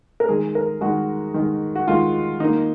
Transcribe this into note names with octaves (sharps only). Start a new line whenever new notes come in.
A#4
D#3 G#3 G#4
A#4
D#3 G#3 F#4
D#3 G#3
F#4
D#3 G#3 F4
D#3 A#3 D#4